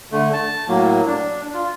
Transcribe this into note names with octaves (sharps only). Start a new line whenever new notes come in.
D3 A3
A5
A2 F#3 A#3
D4
F4